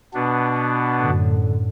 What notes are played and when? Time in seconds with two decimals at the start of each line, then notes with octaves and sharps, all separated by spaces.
0.14 B2 B3 D4
0.99 F#2 A2 D3